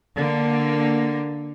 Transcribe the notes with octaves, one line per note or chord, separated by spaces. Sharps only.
D3 A#3